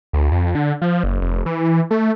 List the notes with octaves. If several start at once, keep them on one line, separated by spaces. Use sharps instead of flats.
D2
F2
D3
F3
F#1
F1
E3
A3